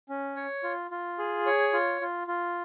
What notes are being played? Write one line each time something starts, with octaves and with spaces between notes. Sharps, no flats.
C#4
C#5
F4
F4
G#4
C#5
F4
F4
F4